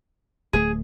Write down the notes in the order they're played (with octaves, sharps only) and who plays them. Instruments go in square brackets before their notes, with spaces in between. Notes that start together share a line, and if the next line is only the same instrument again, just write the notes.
[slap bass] D1 A3 [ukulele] G#4